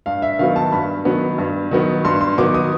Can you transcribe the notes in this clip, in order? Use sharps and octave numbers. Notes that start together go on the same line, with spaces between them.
G2 F5
E5
D#3 F#3 B3 F5
A5
G2 B5
D#3 F#3 B3
G2
D#3 F#3 B3
G2 C6
C6
D#3 F#3 B3 D6
D#6